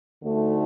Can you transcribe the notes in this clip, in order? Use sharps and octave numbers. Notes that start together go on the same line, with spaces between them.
D2 D3 A3 D#4